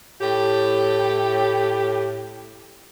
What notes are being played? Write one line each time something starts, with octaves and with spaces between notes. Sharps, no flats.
A2 G4